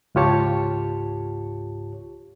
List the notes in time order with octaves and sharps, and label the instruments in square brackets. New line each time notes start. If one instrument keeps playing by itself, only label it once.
[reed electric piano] C#2 G#2 F4 G4 C#5 A5